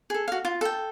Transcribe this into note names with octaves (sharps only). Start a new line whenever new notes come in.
G#4 A4
F#4 F5
F4
A4 G5